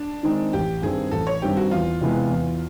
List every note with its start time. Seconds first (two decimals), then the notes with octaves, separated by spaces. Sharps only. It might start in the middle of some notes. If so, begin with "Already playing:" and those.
Already playing: D4
0.23 D#3 G#3 C4 D#4
0.53 A1 G4
0.82 G2 D#3 G3 C4 G#4
1.11 A1 A4
1.27 C#5
1.42 G2 D#3 G3 C4 G4
1.57 F#4
1.71 E2 F4
2.01 C3 E3 G#3 B3
2.30 E2